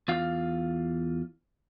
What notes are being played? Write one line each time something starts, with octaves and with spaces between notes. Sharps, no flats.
E2 F4 F5